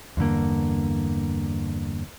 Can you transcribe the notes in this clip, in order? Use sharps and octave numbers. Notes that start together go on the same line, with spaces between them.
E2 G2 D3 A#3